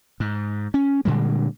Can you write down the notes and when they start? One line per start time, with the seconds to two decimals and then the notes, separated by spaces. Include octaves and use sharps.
0.20 G#2
0.74 C#4
1.05 A#2 D3 G3 G#3